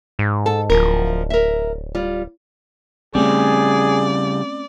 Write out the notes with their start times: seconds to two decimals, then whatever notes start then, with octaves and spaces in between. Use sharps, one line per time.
0.19 G#2
0.46 A4
0.70 D1 F3 A#4
1.30 A#4 E5
1.95 G3 F4
3.15 C#3 G3 A3 C4 C#4 G#4 D5